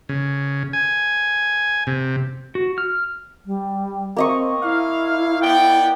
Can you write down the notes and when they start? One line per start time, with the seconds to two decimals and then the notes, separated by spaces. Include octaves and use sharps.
0.09 C#3
0.73 G#5
1.87 C3
2.55 F#4
2.78 F6
3.46 G3
4.17 A#3 C4 D#5 C#6
4.63 E4 F5
5.42 B3 D5 G5